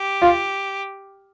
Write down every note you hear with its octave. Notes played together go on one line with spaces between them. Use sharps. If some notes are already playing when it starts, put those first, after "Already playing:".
Already playing: G4
F4